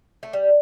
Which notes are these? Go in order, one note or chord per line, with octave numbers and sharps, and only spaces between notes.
A3
G3